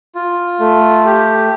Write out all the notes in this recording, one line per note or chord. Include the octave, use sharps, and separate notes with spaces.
F4
A3
G4